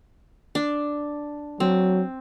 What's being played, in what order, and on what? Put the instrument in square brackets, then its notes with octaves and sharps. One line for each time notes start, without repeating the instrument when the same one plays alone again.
[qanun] D4
[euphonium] F#3 [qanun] C4